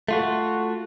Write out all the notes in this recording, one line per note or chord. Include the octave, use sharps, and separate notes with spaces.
A3 F4 F#4